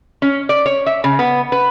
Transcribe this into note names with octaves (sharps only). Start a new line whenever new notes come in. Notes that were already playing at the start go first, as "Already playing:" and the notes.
C#4
D5
C#5
E5
C#3
B3
B4